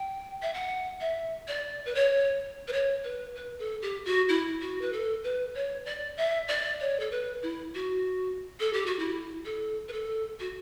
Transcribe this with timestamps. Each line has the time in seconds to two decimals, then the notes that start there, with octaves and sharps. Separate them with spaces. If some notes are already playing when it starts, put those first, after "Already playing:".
Already playing: G5
0.42 E5
0.54 F#5
1.01 E5
1.48 D5
1.86 B4
1.95 C#5
2.68 B4
2.73 C#5
3.04 B4
3.35 B4
3.59 A4
3.82 G4
4.06 F#4
4.29 E4
4.61 F#4
4.81 B4
4.93 A4
5.24 B4
5.55 C#5
5.86 D5
6.17 E5
6.48 D5
6.80 C#5
7.00 A4
7.11 B4
7.42 E4
7.74 F#4
8.60 A4
8.73 G4
8.86 F#4
8.99 E4
9.45 A4
9.88 B4
9.93 A4
10.40 F#4